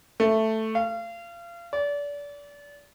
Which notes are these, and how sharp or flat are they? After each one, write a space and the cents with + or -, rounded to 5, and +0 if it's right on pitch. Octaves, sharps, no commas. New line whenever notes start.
A3 +5
F5 -30
D5 -30